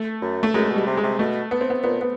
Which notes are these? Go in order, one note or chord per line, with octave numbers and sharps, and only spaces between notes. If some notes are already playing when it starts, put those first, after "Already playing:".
Already playing: A3
F#2
A3
F#2 G#3
B2
G3
C3
G#3
C3
B2 A3
B3
C4
B3
A#2 B3
B3